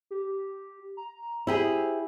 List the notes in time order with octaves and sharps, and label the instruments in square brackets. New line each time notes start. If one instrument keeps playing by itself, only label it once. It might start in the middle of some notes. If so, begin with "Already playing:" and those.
[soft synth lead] G4
A#5
[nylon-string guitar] E4 G4 G#4 [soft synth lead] C5